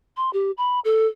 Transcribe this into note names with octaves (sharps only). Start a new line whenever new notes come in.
C6
G4
B5
A4